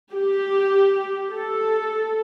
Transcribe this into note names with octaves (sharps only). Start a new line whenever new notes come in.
G4
A4